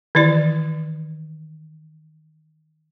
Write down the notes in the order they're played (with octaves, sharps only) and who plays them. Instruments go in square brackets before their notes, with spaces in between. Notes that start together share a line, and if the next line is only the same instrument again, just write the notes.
[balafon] D#3 E3 E4 D5